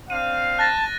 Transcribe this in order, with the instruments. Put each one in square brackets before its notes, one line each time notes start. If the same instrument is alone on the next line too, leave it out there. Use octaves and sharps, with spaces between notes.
[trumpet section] C4 D4 F5 [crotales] D#7
[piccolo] A5 [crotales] F#6 A6 A#6